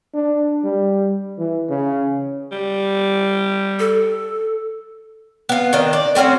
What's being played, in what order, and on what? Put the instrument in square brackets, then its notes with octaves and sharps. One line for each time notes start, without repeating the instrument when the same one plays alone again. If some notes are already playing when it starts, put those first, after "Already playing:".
[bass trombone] D4
G3
E3
C#3
[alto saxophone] G3
[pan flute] A4
[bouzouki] B3 F4
D#3 D4 D#5
D5
A3 C4 C#4 F#4